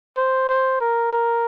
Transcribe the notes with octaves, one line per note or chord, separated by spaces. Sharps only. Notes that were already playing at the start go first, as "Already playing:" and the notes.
C5
C5
A#4
A#4